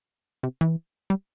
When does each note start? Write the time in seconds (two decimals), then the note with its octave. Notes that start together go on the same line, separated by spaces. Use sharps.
0.43 C3
0.61 E3
1.10 G3